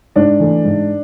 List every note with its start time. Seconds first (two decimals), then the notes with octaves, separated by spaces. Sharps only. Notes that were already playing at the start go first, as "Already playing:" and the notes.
0.16 G#2 D4
0.40 E3 A3
0.65 G#2